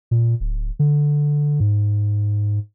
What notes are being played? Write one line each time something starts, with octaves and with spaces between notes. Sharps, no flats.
A#2
D1
D3
G#2